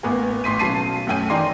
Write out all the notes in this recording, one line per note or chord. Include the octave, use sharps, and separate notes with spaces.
A1 A#3 B3 A#4 G#5
A1 C6 B6 D#7
B1 F#3 C#4 A5 C7 D#7
F#2 A3 C#4 G5 G#5 D#7
D#3 E3 D5 G#5 A#5 C6